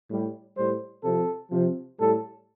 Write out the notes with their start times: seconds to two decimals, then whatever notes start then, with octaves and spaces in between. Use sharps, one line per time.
0.10 A2 G3
0.57 A2 G3 C5
1.04 C3 F3 A4
1.51 C3 F3
1.99 A2 G3 A4